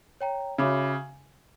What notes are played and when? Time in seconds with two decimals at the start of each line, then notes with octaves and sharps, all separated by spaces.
0.21 C#5 G5 A#5
0.58 C#3 F#4 C#5 E5 B5 D6